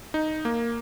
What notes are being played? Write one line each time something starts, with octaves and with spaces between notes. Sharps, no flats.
D#4
A#3